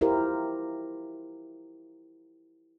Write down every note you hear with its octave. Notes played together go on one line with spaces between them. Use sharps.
E4 F4 G4 A#4 C5